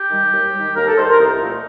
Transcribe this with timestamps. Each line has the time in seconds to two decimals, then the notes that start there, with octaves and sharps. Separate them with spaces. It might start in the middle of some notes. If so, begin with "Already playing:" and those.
Already playing: G4
0.09 D#3 G3
0.31 D#2
0.53 D#3 G3
0.75 D#2 A#4
0.86 A4
0.96 D#3 G3 C5
1.08 A#4
1.18 C2 D#4
1.40 A#2 F3 A3